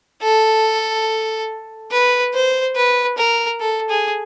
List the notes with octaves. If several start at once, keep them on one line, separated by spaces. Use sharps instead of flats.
A4
B4
C5
B4
A#4
A4
G#4